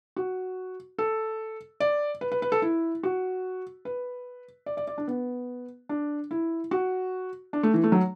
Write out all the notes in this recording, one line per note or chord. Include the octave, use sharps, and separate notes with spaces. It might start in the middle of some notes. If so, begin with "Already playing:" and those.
F#4
A4
D5
B4
B4
B4
A4
E4
F#4
B4
D5
D5
D5
D4
B3
D4
E4
F#4
D4
A3
E3
A3
F#3